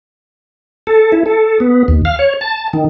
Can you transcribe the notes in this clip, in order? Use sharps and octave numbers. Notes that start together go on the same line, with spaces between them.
A4
E4
A4
B3
D#2
F5
C#5
A5
D#3